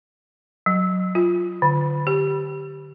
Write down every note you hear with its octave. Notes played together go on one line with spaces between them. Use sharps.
F#3
F4
D3
G4